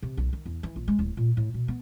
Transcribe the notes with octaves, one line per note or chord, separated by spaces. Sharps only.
C3
B1
D#3
E2
E3
A#1
G#3
D1
A#2
A2
B2
B3